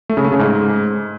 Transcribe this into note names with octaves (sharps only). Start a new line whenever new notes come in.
A3
C#3
A3
C#3
G#2